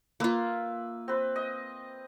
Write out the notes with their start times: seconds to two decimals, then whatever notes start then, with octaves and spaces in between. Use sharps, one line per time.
0.20 A#3 F4 B4 E5
1.08 C4 B4
1.36 D#5